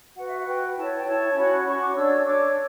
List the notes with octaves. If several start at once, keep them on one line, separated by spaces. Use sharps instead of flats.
F#4 B4 F#5
E5
F#5
F#4 B4 G5
E4 A4 C#5 A5
G5
E4 A4 C#5 A5
C#4 F#4 C#5 B5
C#4 F#4 C#5 C#6
D6
D4 A4 C#5 E6
D4 A4 C#5 D6